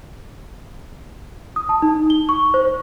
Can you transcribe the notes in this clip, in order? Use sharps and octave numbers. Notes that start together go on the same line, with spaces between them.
D#6
A5
D#4
G7
C#6
C5